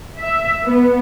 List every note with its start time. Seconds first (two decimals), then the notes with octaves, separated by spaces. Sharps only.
0.18 E5
0.64 B3